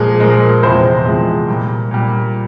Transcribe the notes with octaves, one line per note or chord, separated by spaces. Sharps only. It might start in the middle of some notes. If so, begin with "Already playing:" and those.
Already playing: A#2 F3 G#3 G#4
A#2 F3 G#3 A#4
E2 C3 F3 G#3 C5
E2 C3 F3 G#3
A#2 G3
A#2 G3